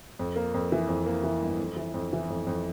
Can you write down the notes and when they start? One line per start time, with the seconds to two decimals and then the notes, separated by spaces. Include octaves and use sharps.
0.19 F2
0.36 A#3
0.54 F2
0.72 E3
0.89 F2
1.06 A#3
1.24 E3
1.42 G1
1.59 F2
1.76 E3
1.94 F2
2.13 E3
2.30 F2
2.47 F2